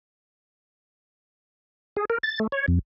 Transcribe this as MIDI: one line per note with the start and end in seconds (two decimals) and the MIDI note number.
1.97 2.05 68
2.10 2.18 70
2.23 2.39 93
2.40 2.47 57
2.52 2.66 73
2.68 2.79 41